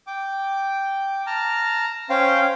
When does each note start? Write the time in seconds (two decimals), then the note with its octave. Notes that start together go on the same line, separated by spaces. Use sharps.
0.07 G5 D6
1.26 A5 A#5 F6
2.10 C#4 C5 F5 G5